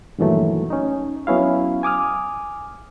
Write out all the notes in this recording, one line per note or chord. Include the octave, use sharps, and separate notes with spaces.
G2 A#2 D#3 E3 F#3 A3
C#4 D#4
F#3 B3 C#4 E4 F5
G#5 D6 D#6 F6